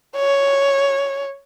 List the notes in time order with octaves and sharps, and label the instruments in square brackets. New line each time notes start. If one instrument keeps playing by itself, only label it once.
[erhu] C#5